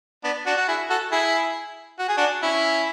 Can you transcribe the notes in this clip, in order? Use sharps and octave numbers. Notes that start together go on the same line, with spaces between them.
B3 D4
D4 F#4
F#4
E4 G#4
F#4 A4
E4 G#4
F#4
G#4
D4 F#4
C#4 E4